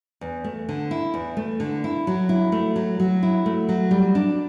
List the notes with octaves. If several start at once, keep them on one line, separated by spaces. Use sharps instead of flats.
E2
A3
D3
E4
E2
A3
D3
E4
F#3
E4
A3
F#3
F#3
E4
A3
F#3
G3
D4